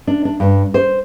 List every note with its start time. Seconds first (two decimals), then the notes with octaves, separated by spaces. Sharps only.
0.07 D4
0.25 D4
0.40 G2
0.74 C5